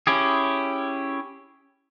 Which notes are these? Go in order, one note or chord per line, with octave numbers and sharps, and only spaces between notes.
C#4 E4 G4 G#4